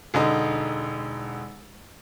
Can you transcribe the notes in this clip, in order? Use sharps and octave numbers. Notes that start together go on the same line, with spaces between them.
E1 D3 D#4